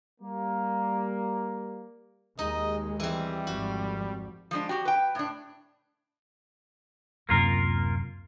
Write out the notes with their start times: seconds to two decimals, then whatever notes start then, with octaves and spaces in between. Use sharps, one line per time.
0.20 G3 A#3
2.39 D#2 G#3 D#4 D#5
3.00 E3 G3 C4
3.47 G#1 F2 F#4
4.51 F3 G#3 D4
4.69 F#4 G4
4.85 B4 G5
5.15 A2 D4
7.29 D1 F#2 C3 A#3 F4 A#4